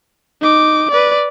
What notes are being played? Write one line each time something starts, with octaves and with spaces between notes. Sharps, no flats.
D#4 D6
B4 D5